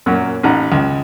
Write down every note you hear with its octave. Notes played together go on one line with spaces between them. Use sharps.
F#2 A#2 F#3
A1 D#4 F#5 A#5
C#2